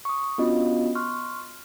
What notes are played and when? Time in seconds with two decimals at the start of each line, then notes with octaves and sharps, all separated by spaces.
0.05 C#6 D#6
0.38 B3 C#4 D4 F4 F#4 D#5
0.95 C6 C#6 F6 F#6